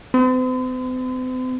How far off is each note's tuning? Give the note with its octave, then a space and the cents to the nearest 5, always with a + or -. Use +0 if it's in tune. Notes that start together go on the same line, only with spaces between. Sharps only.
C4 -45